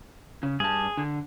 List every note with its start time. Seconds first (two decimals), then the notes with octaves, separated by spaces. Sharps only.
0.43 C#3
0.60 G2 G#4 A5
0.97 D3